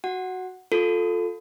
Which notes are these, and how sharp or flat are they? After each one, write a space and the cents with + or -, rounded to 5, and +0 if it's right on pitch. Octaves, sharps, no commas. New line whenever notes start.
F#4 +0 F#5 +0
F4 +20 A4 +0